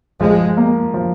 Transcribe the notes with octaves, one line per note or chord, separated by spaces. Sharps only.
F3 G#3
A#3
F3